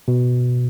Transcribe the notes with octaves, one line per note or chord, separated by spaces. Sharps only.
B2